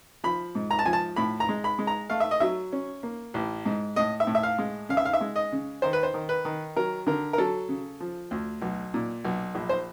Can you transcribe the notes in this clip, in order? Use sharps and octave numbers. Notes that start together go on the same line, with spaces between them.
F3 B5
G#2
A#5
A5
F3 G#5
A5
A2 B5
A#5
G#3
B5
G#3
A#5
A3 F5
E5
D#5
F#3 E5
C#4
A#3
A1
G#2
A2 D#5
E5
A2
E5
F5
G#3
C#3 F5
E5
F5
E5
G#3
D#5
C#3
D#3 C5
B4
C5
D#3
B4
D#3
F#3 A#4
D3 A#4
A#4
F#3 A4
C#3
F3
D2
B1
A#2
B1
A#1
C5